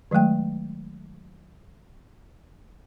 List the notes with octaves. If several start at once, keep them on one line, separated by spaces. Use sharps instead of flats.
D#3 F#3 G#3 A3 G5